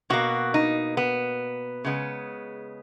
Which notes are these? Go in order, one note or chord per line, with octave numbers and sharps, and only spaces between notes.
B2 A#3 F#4
D#4
B3
C#3 G#3 B3